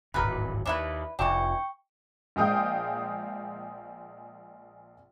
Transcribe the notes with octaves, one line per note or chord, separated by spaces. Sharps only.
D1 G#1 G2 A#4 B4
D#2 D4 E4 B4
F1 E3 D4 G5 C#6
A#1 G#3 D#5 F5 G5 D#6